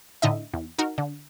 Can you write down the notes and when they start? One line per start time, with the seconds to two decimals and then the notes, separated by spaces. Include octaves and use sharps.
0.22 A2 D3 D#4 D#5 E5
0.54 E2
0.79 D#4 F#4 A#4
0.98 D3